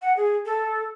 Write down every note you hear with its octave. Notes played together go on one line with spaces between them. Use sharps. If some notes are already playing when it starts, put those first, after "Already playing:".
F#5
G#4
A4